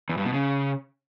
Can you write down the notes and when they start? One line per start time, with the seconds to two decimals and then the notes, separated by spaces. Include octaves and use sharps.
0.09 E2
0.17 G2
0.25 B2
0.33 C#3